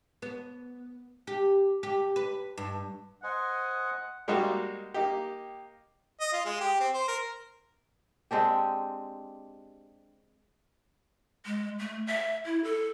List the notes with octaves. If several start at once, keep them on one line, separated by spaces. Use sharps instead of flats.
B3
G4
G4
B4
G2
C5 D#5 F#5 G#5
G3 G#3 A#3 D#4 F#4 G4
A#3 D#4 G4
D#5
F4
G#3
G4
C4
C5
A#4
G#3 C4 D4 G4
G#3
A3
E5
E4
A4